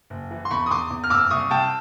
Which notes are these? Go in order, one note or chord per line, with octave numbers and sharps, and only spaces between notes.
F#1
E3
C6
E2 B5 C#6
D#6
E2 C6 D6
E2
F6
F#1 D6 E6
C2 C#6 D#6
C2 G5 A5